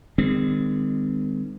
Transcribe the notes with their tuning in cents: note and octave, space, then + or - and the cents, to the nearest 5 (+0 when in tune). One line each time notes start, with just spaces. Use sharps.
D#3 -35 G#3 -45 C4 -35